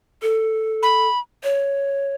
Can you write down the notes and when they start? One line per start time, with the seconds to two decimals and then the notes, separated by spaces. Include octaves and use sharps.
0.22 A4
0.83 B5
1.44 C#5